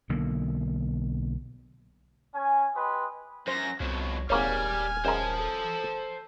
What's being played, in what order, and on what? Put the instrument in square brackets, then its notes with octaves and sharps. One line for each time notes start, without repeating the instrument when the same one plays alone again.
[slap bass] B1 D3 A#3
[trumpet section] C#4 G#5
G4 B4 D#5 G#5 C6
[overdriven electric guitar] F#2 [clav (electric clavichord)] C5 [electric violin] A#6
[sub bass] C2 [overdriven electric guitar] F2 B2 [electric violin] C#5
[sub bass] D#1 [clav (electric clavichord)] G#1 A#3 C#5 [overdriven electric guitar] G3 [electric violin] G#5 F6
[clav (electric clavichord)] F#2 G#3 A#4 [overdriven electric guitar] C5 A5
[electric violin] A4